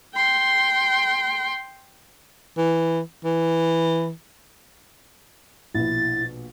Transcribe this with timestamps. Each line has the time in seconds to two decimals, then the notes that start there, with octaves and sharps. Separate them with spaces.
0.15 G5 C6
2.57 E3
3.25 E3
5.74 A#1 B2 E4 A6